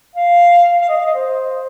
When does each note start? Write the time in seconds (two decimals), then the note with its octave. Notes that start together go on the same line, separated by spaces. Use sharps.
0.15 F5
0.81 F5
0.89 D#5
0.97 F5
1.05 D#5
1.14 C5